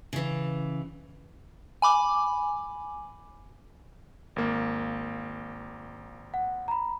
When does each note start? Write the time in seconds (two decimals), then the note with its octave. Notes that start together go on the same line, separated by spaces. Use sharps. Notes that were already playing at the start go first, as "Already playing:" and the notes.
0.13 C#3 E3
1.82 G#5 B5 D6
4.36 G#1 A#3
6.34 F#5
6.68 A#5 B5